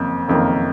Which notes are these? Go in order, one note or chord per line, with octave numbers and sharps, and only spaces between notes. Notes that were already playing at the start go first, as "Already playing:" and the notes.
Already playing: F#1 F2 D#3 A#3
F#1 F2 D#3 A#3